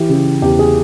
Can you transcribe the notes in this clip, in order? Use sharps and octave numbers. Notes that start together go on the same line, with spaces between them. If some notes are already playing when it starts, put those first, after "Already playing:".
Already playing: E3 G4
C#3
E2 G4
G#4